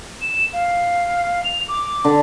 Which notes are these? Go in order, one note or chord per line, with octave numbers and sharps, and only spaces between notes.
E7
F5
F7
D6
D3